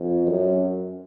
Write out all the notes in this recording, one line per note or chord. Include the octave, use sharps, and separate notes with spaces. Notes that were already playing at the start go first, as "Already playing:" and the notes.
Already playing: F2
F#2